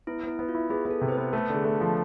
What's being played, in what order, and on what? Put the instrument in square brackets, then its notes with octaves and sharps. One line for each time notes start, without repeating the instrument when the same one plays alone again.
[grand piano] B3 [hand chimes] E4
[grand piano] B3 [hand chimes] E4
[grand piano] B3
[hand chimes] F4
[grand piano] E4
[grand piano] B3 [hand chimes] G#4
[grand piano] B3
[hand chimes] A4
[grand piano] C3
[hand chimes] C5
B4
[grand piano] B3
[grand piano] A3 [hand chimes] A4
[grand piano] D3
[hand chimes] G#4
[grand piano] A3
[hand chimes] A4
[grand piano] F3